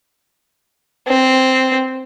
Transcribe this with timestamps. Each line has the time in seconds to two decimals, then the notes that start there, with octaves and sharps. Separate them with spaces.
1.07 C4